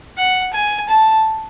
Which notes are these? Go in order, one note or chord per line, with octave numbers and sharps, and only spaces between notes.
F#5
G#5
A5